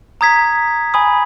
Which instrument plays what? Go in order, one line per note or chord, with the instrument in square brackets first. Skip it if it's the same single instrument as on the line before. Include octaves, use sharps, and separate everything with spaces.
[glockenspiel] A#5 D#6 G#6 B6
G#5 B5 D#6